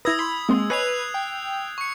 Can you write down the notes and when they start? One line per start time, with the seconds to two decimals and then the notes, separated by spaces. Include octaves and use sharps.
0.05 E4 B4 D#6 E6 G#6 A#6
0.19 B5 C6
0.49 G#3 A#3 C4 C6
0.70 B4 C#5 D#5 G#5 F#6 C7 F7
1.14 G5
1.78 C#6 C#7